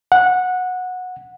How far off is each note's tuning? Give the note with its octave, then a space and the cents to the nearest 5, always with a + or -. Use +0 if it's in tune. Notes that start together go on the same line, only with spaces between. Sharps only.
F#5 -15